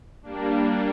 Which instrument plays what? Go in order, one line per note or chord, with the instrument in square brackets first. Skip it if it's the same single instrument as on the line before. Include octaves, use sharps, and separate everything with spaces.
[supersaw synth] G3 A#3 D4